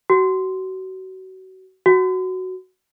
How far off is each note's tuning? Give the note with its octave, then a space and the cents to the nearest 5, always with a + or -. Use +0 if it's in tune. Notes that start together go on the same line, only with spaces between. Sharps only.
F#4 +30
F#4 +5